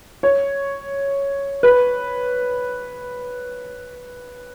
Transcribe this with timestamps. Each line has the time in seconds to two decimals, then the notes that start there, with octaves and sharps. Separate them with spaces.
0.23 C#5
1.63 B4